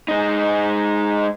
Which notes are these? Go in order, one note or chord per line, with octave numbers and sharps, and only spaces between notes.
G#3 D#4